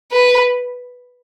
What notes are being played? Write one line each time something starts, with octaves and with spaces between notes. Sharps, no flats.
B4